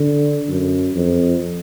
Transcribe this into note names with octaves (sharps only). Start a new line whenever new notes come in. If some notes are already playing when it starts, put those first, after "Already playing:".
Already playing: D3
F#2
F2